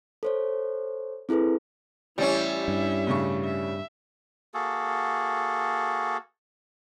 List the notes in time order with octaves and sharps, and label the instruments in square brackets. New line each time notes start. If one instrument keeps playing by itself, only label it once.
[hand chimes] A4 C5 C#5
C4 E4 G#4 A4 B4
[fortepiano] A1 C#5 [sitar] G3 C#4 [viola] E4 E5
[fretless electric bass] G2
[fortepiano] A2 C#3 C#6
[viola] E5
[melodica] A#3 F#4 G#4 A4